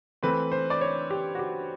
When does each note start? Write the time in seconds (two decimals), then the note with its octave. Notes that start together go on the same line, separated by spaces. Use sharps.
0.23 E3 A3 C4 B4
0.52 C5
0.70 D5
0.81 C#5
1.10 G4
1.35 F#4
1.39 G4